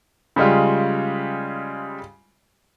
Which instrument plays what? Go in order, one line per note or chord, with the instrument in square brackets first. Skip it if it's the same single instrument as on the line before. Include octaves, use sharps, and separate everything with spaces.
[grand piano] C#3 G3 G#3 F4